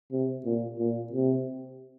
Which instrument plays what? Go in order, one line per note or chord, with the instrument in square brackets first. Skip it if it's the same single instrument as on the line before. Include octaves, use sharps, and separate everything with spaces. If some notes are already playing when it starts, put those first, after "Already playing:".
[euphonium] C3
A#2
A#2
C3